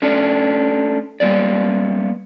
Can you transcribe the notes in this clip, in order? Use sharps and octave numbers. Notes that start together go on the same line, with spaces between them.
A3 C#4 D4
G3 A#3 B3 D5